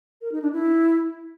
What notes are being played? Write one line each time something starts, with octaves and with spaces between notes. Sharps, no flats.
A#4
D#4
D4
E4